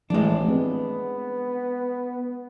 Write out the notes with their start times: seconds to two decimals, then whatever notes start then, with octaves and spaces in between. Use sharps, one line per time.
0.10 A1 E3 F3 G#3 A3 D4
0.48 B3 C4